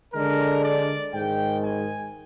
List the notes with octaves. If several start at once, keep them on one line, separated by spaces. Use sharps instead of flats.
D3 G#3 D4 A#4
D5
G#2 D#3 G#3 G5
G#5